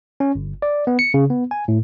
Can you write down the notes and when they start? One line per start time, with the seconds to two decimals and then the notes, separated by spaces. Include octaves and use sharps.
0.20 C#4
0.35 G1
0.62 D5
0.87 B3
0.99 C#7
1.14 C#3
1.30 B3
1.51 G#5
1.68 A2